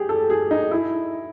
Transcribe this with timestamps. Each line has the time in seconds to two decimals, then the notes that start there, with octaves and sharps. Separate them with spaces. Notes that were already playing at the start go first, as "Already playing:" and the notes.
Already playing: G4 G#4
0.09 A4
0.30 G#4
0.51 D#4
0.71 E4